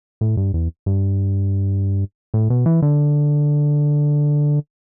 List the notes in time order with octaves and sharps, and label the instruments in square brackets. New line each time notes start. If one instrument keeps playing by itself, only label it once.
[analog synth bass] A2
G2
E2
G2
A2
B2
E3
D3